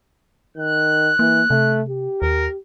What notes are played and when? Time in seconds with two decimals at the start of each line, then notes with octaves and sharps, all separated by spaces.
0.57 D#3 F#6
1.19 E3 A#3
1.50 C3 A3
1.89 G4
2.22 D#2 A#4